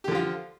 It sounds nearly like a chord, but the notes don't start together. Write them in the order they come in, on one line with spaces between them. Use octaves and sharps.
G4 D3 F3 F4